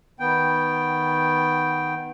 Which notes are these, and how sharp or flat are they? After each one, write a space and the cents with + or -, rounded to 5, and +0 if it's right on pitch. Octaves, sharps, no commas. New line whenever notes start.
D#3 +0 B3 +0 G5 +0